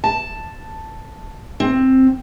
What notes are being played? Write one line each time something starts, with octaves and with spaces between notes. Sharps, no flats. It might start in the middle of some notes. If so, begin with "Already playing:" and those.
A5
C4